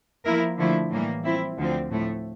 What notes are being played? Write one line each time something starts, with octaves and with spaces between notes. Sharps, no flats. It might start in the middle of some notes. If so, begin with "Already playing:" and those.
F3 A#3 E4 A#4
D3 F3 A3 E4
A2 E3 G3 A#3
F3 C4 E4
D2 D3 F3 C4
A2 F3 A3 E4